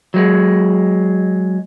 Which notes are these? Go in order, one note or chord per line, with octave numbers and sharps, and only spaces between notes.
F#3 G#3